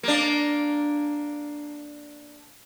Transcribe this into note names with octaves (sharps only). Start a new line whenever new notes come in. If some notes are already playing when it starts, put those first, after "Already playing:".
A#3 D4